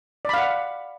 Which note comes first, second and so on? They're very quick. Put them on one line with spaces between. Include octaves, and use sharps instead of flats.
D5 B5 F5 F#5